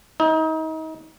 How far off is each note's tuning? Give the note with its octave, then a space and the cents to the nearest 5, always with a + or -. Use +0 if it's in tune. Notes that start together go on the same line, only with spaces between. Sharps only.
D#4 +30